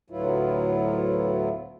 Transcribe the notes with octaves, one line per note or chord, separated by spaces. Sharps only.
D2 A2 F#3 B3 E4 F4